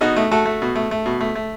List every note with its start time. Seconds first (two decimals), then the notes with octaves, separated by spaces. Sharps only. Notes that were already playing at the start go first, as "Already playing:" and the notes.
0.01 B2 D#4 F#4
0.16 A3
0.31 A3 F#4 A4
0.46 A3
0.62 B2
0.75 A3
0.91 A3
1.06 B2
1.21 A3
1.35 A3